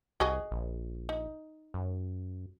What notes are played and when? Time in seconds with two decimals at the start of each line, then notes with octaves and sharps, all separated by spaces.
0.20 C2 F#4 G#4 D#5
0.51 A#1
1.09 D#4
1.74 F#2